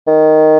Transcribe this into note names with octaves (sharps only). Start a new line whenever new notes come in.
D#3